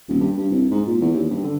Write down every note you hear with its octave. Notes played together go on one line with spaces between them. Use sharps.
D#1
G2
G2
C2
G#2
A#2
E2
D#2
G2
D3